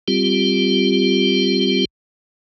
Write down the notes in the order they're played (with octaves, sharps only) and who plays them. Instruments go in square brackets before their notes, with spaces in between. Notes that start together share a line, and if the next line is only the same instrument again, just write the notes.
[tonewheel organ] G3 C4 F4 G4